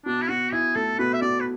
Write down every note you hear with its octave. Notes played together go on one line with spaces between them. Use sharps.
B2 D4
E4
B2 F#4
E4 G#4
A3 A4
B2 B4
E5
B2 D5
B4